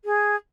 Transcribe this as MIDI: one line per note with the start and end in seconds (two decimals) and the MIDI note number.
0.04 0.35 68